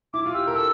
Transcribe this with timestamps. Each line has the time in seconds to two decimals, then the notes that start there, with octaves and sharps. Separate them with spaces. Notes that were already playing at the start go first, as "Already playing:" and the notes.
0.14 E4 D6
0.26 F4
0.34 G4 E6
0.47 A#4
0.55 A4 E6